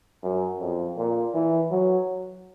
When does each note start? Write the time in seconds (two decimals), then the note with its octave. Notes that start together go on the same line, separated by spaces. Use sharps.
0.23 F#2
0.60 F2
0.97 A#2
1.34 E3
1.71 F#3